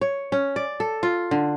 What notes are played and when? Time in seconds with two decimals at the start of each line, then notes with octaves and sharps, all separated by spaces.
0.01 C#5
0.32 C#4
0.56 D5
0.80 A4
1.03 F4
1.31 D3